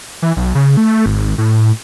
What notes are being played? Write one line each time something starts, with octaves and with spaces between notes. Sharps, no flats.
E3
B1
C#3
A3
G#1
A2